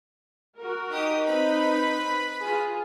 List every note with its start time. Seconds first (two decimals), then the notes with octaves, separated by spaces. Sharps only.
0.58 F#4 A#4
0.91 D#4 G4 D#6
1.26 C4 B4 B5
2.42 F4 G#4